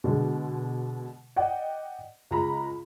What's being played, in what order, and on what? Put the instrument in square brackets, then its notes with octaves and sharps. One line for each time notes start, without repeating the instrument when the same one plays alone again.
[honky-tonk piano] B2 D3 G#3
D5 D#5 F#5 G5
C#2 G#3 A#5 B5